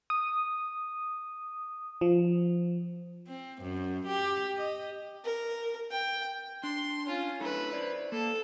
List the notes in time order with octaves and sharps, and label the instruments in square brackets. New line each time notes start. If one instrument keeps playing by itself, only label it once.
[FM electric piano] D#6
F3
[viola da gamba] C4
F#2
G4
D#5
[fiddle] A#4
G5
[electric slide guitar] D4 [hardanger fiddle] C6
[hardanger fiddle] C#4 F4
[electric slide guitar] D4 E4 A4 [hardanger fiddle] B4
[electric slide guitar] C5 D5
[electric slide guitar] A#3 [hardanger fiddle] A4